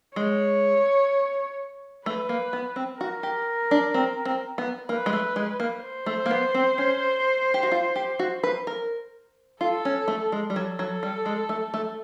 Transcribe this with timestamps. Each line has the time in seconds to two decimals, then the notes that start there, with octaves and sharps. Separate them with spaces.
0.16 G#3 C#5
2.05 A3 B4
2.29 A#3
2.53 B3
2.76 C4
3.01 F#4 A#4
3.23 G4
3.71 D4
3.94 C4
4.25 C4
4.58 B3
4.89 A#3 B4
5.06 G#3
5.13 A3
5.36 G#3
5.60 A#3
5.83 C5
6.06 A3
6.26 A#3
6.31 B3
6.54 C4
6.78 C#4
7.54 G4
7.63 F#4
7.72 F4
7.96 G4
8.19 F#4
8.43 B4
8.67 A#4
9.61 F4 A4
9.85 C#4
10.08 A3
10.32 G#3
10.50 G3
10.55 F#3 A4
10.79 F#3
11.03 G3
11.26 G#3
11.49 A3
11.74 A3